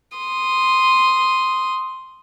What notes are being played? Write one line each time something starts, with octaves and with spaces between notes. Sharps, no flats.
C6 D#6